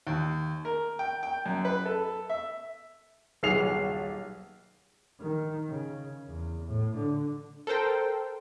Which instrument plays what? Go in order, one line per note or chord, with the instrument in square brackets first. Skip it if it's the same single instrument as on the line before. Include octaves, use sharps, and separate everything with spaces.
[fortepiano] D#2
A#4
G5
G5
F#2
B4
A4
E5
[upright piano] D#1 B1 G#4 C7 F7
[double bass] D#3
C#3
E2
A2
D3
[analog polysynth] A4 A#4 C5 G5